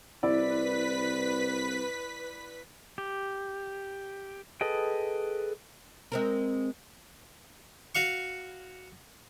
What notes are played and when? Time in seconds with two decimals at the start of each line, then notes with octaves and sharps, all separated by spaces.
0.23 C2 E4 B4 D5 B6
2.98 G4
4.61 G#4 A4 B4 D#5 G5
6.12 G#3 C4 A#4
7.95 F#4 F5 C#6